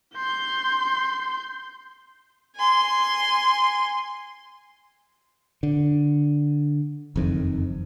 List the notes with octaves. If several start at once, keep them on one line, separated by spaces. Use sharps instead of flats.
C6 G6
G#5 C6
D3
F#1 F2 D#3